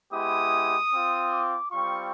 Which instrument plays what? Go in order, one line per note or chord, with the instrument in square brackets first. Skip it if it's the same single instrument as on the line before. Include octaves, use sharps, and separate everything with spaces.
[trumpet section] G#3 B3 E4 G4 D#6
C4 F4
D6
G3 C4 F4 C#6